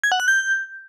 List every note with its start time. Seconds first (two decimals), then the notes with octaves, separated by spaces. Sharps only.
0.04 G#6
0.12 F#5
0.20 F#6
0.28 G6